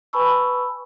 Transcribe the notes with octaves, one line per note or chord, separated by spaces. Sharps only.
B4 G#5 A5 B5 C#6 E6